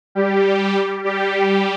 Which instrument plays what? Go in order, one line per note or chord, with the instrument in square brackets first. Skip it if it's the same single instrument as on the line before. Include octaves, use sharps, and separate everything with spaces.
[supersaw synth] G3 G4
G3 G4
G3 G4